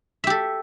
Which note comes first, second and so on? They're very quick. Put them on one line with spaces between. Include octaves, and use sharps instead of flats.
E5 G4 A4